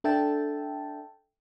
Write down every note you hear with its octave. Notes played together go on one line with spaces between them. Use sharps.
D4 A4 E5 G5 A5